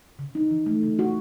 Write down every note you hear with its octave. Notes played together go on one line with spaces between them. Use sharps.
C#3
D#4
E3
A3
C#3
F#4